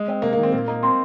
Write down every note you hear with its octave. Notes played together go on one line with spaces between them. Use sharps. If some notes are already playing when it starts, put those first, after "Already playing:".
Already playing: G#3
C4
C3 A#3
D#3 A#3
C4
A#2 A#3
A#3 D#4
C4 C5